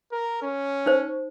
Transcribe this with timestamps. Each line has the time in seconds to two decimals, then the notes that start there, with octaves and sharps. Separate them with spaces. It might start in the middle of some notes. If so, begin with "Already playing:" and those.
0.12 A#4
0.42 C#4
0.86 D#4 C5